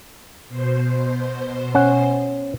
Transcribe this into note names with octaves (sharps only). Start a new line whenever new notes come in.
B2 C5
C#4 F#5